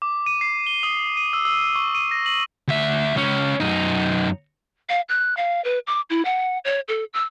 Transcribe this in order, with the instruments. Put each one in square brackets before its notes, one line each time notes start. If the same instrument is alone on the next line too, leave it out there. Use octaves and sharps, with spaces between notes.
[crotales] D6
D#7
C7
G7
D#6
D#7
E6
E6
C#6
D#7
A#6
F#7
[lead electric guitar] D2 E5
C#2 C#4
F#2 D#4
[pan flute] F5
F#6
F5
B4
D6
E4
F#5
C#5
A4
E6